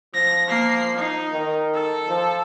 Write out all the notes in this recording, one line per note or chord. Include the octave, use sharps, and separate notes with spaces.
F3 A#6
A#3 C7
D#4
D#3
A4
F3